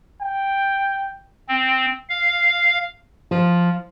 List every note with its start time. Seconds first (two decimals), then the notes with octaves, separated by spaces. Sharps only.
0.21 G5
1.49 C4
2.09 F5
3.31 F3